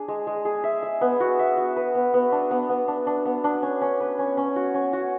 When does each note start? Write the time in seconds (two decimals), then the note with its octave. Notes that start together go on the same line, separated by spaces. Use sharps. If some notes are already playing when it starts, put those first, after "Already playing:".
Already playing: D4 G#4
0.08 G#3
0.27 G#3
0.45 G#4
0.64 E5
0.83 E5
1.01 B3
1.20 F#4
1.39 E5
1.57 F#4
1.77 B4
1.95 B3
2.14 B3
2.32 D4
2.51 B3
2.69 B3
2.88 D4
3.07 D4
3.26 B3
3.44 D4
3.62 C#4
3.81 C#4
4.00 B4
4.19 C#4
4.37 C#4
4.56 F#4
4.74 C#4
4.93 F#4